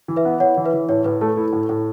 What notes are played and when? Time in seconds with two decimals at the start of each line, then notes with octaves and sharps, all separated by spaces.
0.08 E3
0.16 B4 E5
0.25 B3
0.40 E4 C#5 F#5
0.57 E3
0.64 B4 E5
0.73 E3
0.89 A2 C#5
1.04 A2 B4
1.21 A3 A4
1.37 E4 A4
1.53 A2
1.69 A2